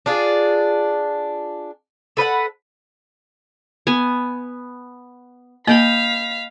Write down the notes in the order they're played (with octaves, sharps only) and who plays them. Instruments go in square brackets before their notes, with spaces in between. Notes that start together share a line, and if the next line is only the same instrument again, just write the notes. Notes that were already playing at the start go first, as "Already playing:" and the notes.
[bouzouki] D4 F4 G#4
A4 B4 D#5 F#5
[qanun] B3 G#5
[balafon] A#3 [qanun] D#5 G5 B5 [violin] F5 B6